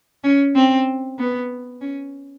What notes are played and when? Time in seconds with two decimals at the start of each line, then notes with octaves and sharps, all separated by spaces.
0.24 C#4
0.55 C4
1.19 B3
1.81 C#4